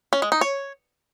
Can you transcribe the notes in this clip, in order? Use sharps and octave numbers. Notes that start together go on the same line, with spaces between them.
C#4
G#3
D#4
C#5